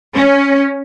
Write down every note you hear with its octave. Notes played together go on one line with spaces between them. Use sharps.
C#4